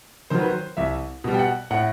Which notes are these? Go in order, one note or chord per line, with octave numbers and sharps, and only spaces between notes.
D#3 F#3 C5
B4
C5
C2 E5
B2 G3
G5
F#5
A2 F#5